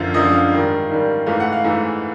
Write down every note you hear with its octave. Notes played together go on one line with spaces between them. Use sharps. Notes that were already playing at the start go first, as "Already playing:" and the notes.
Already playing: F#2 D3 F3 F5
F#2 D3 F3 D#5
F5
G#2 D#3 G3
G#2 D#3 G3
G#2 E3 A3 F5
F#5
F5
G#2 E3 A3